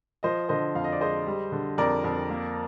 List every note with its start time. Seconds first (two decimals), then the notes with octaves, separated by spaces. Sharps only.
0.23 F3 C5 D#5
0.49 D3 C5 D#5
0.75 F2 F5
0.84 D#5
0.92 D5
1.01 G#3 C5 D#5
1.26 G3
1.52 D3
1.78 F2 A#4 D5
2.04 F2
2.30 A#3